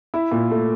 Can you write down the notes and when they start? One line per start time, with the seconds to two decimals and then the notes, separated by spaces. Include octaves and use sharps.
0.14 E4
0.32 A#2
0.51 A3